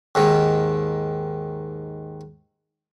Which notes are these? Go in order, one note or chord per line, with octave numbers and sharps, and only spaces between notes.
D#2 G#2 D#3